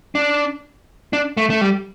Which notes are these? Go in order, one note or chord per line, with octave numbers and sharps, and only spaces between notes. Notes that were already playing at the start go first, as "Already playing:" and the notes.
D4
D4
A3
A3
G3